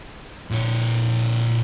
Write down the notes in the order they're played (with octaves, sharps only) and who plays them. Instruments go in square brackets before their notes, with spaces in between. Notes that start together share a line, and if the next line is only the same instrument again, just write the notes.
[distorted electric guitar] A#2 C#5